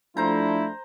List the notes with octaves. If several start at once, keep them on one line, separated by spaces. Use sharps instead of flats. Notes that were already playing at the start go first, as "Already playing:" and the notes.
F3 A3 D4 E4 C5 A#5